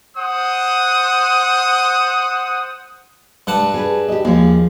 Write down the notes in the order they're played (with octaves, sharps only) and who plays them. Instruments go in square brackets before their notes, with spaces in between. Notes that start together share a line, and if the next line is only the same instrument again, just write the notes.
[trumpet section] C5 F#5 D#6
[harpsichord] G2 F#5 A5
[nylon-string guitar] G#4 B4
G4 D#5
[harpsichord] D#2 [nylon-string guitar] F3 G#4